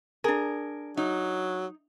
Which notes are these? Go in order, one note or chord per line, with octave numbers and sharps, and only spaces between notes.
D4 G#4 A#4
F#3 D#4